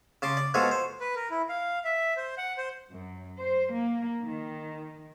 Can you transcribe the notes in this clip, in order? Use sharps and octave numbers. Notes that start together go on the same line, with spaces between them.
C#3 A5 C6 D6
D5
B2 F3 G#3 G#4 A4 C#5
C5
B4
A#4
E4
F5
E5
C5
F#5
C5
F#2
C5
A#3
D#3